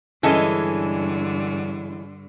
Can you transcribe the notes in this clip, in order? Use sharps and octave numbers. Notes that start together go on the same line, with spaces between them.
G2 D3 E3 G#3 C#4 A4 G#5